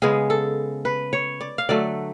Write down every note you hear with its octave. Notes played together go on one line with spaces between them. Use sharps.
C#3 G#3 B3 G#4
A4
B4
C#5
D5
F5
D3 F#3 A3 D5